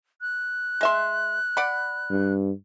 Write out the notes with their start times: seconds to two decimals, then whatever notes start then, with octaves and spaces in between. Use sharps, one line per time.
0.21 F#6
0.81 G#3 E5 C6
1.57 D5 F#5 B5
2.11 G2